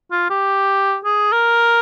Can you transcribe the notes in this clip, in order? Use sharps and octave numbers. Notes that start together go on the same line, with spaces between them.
F4
G4
G#4
A#4